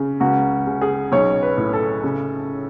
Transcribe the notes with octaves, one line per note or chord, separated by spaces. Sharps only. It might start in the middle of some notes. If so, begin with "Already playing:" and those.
Already playing: C#3
C#2 F#4
C#3
G#4
B1 C#5
B4
A2
A4
C#3